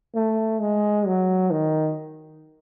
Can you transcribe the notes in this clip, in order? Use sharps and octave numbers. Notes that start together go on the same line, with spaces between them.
A3
G#3
F#3
D#3